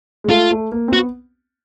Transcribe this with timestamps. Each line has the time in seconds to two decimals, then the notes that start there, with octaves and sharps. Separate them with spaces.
0.24 G#3
0.29 A3 F4
0.51 A3
0.72 A#3
0.88 C4
0.93 B3 F#4